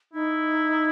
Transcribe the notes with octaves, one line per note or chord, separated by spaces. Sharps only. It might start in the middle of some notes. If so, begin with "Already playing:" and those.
D#4 E4